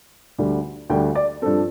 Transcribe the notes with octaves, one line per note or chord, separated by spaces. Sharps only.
D2 D3 G3
D2 D3 G3 G5
D5
G2 F3 C4 A4